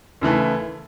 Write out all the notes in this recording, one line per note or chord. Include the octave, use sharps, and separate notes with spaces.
D#2 C#3 E3 A3